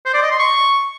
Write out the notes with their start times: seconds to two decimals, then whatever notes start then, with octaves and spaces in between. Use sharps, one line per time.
0.05 C5
0.14 D5
0.22 D#5
0.31 C6
0.39 C#6